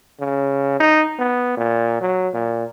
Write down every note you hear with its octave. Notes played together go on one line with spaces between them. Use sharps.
C#3
D#4
B3
A#2
F#3
A#2